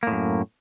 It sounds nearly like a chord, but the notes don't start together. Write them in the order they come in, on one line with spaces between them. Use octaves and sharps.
A#3 A2 F#2